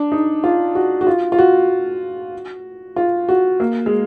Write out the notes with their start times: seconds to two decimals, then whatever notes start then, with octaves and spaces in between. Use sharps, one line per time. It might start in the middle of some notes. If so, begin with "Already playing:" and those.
Already playing: D4
0.12 D#4
0.44 F4
0.75 F#4
1.01 F#4
1.07 F4
1.32 F4
1.38 F#4
2.96 F4
3.29 F#4
3.60 A#3
3.86 G#3